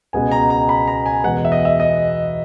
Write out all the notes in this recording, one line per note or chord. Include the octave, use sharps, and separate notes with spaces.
C#2 B2 G#3 B3 G#5
A#5
A#5
B5
A#5
G#5
E2 B2 G#3 B3 F#5
E5
D#5
E5
D#5